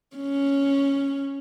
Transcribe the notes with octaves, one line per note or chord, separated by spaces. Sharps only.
C#4